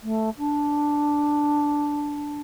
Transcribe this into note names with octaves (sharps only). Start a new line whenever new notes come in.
A3
D4